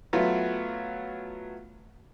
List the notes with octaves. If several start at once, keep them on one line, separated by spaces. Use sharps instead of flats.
F#3 A3 B3 F4 F#4